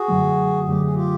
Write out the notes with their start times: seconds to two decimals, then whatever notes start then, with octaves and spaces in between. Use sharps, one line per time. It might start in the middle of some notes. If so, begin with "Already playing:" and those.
Already playing: F#4 G#4
0.08 F#2 D3 F#3 A3
0.67 F#2 D3 F#3 A3 G4
0.81 G#4
0.94 F4 G4